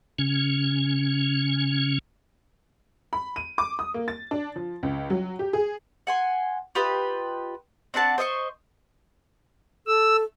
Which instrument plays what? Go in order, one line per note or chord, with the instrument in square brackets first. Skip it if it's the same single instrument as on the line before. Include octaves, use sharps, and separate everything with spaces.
[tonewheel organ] C#3 C#4
[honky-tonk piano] B5
D#7
D6
D#6
A#3
A6
D4
F3
C#2
F#3
G4
G#4
[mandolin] F#5 G#5 C6
F4 G4 B4 D#5
C4 D4 F#5 A5
C5 D#5 E5 C#6
[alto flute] A4 [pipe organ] E6